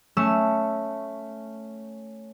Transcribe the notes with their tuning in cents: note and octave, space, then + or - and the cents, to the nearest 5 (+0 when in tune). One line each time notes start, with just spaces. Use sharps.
A3 +5 C#4 +0 E6 +0